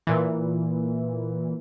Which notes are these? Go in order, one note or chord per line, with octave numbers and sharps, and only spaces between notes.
A#2 E3